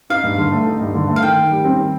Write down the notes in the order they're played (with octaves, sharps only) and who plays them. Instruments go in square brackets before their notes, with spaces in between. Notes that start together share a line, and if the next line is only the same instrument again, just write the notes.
[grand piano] D#4 [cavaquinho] F5
[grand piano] G2
D3
A3
D#4
G2
D3
A3
[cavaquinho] F5
[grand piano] D#3 [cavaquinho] G5
[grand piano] D#3
G3
C4
D#3